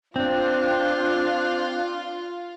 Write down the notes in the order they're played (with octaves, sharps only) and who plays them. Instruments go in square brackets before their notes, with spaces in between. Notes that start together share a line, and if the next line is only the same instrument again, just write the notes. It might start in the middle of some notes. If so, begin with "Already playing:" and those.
[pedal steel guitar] C4 [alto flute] D4 [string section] F4